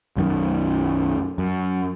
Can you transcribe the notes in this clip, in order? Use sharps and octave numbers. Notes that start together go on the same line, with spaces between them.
B1 F#2 D#3
F#2